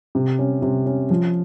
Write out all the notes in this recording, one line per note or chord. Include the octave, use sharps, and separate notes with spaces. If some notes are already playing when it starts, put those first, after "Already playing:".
C3
C#4
C3
C#4
F3